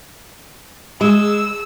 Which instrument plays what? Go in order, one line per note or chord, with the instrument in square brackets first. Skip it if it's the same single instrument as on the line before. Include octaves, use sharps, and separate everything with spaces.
[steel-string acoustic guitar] G#3 [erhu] E6